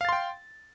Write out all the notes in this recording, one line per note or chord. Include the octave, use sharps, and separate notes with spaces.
F5 G5 C6 A6